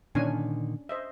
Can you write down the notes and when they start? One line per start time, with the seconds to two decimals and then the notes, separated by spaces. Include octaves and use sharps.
0.15 A#2 D3 D#3 C#4 D4 G#5
0.89 C5 D#5 E5